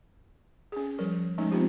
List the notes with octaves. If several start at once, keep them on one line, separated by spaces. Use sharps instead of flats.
C#4 G#4
F3 G3 A#4
F3 G#3 A3 C#4 D#4
B3 C4 D#4 F4 G4 C5